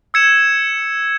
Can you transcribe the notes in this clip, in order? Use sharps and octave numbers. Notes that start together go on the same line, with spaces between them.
E6 G#6 C#7 E7